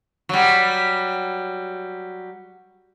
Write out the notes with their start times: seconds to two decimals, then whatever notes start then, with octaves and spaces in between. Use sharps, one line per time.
0.29 F#3 G3